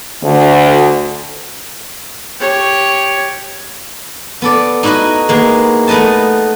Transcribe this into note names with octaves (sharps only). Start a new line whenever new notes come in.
D2
G4 C#5
B3 A4 D5
D#4 E4 F#4 B4 D#5
G#3 A#3 B3
A3 B3 B4 D#5 A5